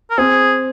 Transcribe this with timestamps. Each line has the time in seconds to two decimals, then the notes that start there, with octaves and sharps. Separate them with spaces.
0.10 A#4
0.18 C4 G#4